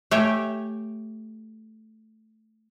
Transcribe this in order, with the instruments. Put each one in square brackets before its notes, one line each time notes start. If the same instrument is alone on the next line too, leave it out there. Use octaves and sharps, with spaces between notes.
[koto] A3 G4 C#5 G5 G#5